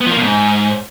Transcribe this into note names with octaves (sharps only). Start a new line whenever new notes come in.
B3
F3
A#3
B2
G#2